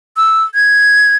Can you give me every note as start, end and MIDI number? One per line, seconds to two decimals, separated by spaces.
0.17 0.44 88
0.55 1.16 92